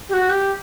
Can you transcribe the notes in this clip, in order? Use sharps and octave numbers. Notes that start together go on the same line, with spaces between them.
G4
F#4
G4